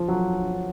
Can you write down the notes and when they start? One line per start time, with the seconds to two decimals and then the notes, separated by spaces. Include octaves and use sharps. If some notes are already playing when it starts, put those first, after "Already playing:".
Already playing: F3
0.08 F#3